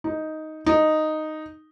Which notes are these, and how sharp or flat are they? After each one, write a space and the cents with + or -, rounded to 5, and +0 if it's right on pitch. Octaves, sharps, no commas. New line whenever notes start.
D#4 +5
D#4 -5